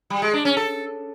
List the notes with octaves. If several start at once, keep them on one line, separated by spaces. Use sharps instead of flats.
G3
G#3
D4
C#4
A4